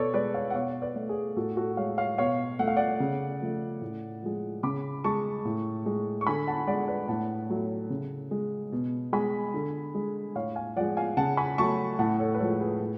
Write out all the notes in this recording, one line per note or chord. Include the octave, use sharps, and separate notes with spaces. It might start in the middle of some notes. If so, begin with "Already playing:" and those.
Already playing: B2 A4 B4 C#5 D5
G#3 B4 D5
C#5 F5
F#5
B2 C#5 F5
B4 D5
A3
G#4
A2 F#4 A4
F#4 A4
G#3 C#5 F5
C#5 F5
B2 C#5 F5
A3 F#5
F5
D5 F#5
C#3
F3 A3
A2
F3 G#3
C#3 B5 D6
G#3 A5 C#6
A2
G#3
C#6
D3 G#5 B5
F#5 A5
G#3 D5 F#5
B4 D5
A2 F#5 A5
F#3 A3
C#3
G#3
B2
G#3 G#5 B5
D3
G#3
A2 C#5 F5
F5 G#5
F3 G#3 D5 F#5
F5 G#5
C#3 F#5 A5
G#5 B5
F#3 A3 A5 C#6
A2 F#5 A5
A4 C#5
B4
F3 G#3 A4 C#5
G#4 B4
A2